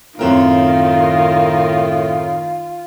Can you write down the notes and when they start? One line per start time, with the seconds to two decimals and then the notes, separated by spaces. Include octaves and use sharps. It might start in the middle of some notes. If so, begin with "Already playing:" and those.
0.19 F#2 A2 D#3 C4 F4 A#4